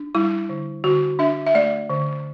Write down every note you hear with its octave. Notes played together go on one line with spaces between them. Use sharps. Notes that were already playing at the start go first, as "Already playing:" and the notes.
Already playing: D4
G3 E4
D3
D3 F#4
D4 E5
E5
A3 D5
D3